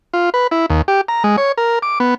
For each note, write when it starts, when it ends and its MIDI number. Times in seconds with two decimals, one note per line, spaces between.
0.14 0.30 65
0.34 0.47 71
0.51 0.66 64
0.70 0.82 39
0.88 1.01 67
1.08 1.23 82
1.24 1.36 56
1.38 1.52 73
1.58 1.79 70
1.82 1.99 86
2.00 2.14 59